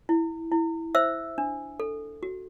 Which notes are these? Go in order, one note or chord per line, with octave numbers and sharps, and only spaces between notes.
E4
E4
C5 E5 E6
D4
A4
F#4